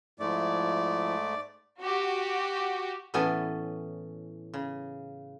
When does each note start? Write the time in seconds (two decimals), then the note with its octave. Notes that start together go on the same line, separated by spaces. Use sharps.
0.20 G#2 F3 A3 E4 D5
1.80 F#4 G4
3.14 A2 E3 B3 C#4 A4 G#5
4.54 C#3